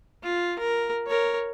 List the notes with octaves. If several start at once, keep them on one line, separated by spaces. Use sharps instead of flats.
F4
A#4
A#4 C#5